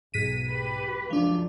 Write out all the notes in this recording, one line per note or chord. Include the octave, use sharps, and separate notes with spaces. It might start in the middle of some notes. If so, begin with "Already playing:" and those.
B1 G#2 B6 D#7
G4 B4
C#2 F#2 F3 D4